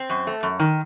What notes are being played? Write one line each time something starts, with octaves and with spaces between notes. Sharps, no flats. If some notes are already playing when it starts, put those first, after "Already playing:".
Already playing: C4
F#2
A3
F#2
D#3